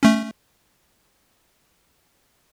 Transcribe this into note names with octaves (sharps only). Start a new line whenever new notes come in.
A3 C#4